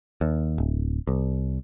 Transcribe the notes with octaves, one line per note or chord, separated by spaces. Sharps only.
D#2
D1
C2